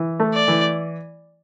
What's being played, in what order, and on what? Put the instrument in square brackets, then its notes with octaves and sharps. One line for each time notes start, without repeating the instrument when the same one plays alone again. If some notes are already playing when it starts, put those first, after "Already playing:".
Already playing: [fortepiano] E3
A3
[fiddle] D5
[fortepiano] E3